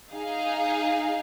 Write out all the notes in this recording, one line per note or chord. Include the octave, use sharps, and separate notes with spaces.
D#4 G#4 F5